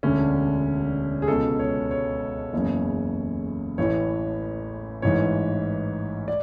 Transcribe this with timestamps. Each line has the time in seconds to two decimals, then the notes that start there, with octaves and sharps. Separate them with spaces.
0.03 E1 D2 D3 C#4
1.22 G#4
1.28 C#2 B2 A4
1.59 C#5
1.91 C#5
2.53 F#1 E2 C#3
3.78 A1 A2 E3 C#5
5.02 A1 G#2 E3 C#5
6.28 D5